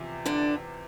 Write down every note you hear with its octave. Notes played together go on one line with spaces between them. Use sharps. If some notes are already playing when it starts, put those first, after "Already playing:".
Already playing: E2 C3 F3
D3 D4